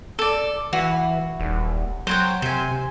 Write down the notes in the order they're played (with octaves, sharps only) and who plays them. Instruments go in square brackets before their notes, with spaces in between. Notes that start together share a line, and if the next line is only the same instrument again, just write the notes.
[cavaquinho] A4 D5
[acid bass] E3 [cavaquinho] F#4
[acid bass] D#1
[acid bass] F#3 [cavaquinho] C5 C#5 G5
[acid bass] C3 [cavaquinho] C5 G#5